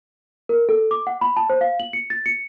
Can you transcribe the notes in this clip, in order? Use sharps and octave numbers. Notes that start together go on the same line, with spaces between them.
A#4
A4
D6
F#5
B5
A5
C5
F5
F#7
C#7
A6
C#7